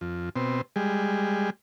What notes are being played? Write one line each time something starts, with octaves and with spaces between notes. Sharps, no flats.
F2
B2 C4
G3 G#3